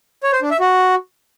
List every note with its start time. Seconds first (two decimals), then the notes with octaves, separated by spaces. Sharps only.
0.23 C#5
0.32 C5
0.42 D4
0.51 E5
0.60 F#4